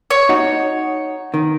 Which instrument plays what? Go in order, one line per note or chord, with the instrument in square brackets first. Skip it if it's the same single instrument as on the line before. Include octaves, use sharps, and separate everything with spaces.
[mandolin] C#5
[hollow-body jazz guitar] D#4 F#4
D#3